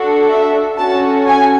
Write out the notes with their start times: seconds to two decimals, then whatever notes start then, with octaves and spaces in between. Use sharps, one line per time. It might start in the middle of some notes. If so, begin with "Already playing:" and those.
Already playing: D4 F#4 A4
0.29 E5
0.78 C#4 F#4 A4 A5
1.27 G#5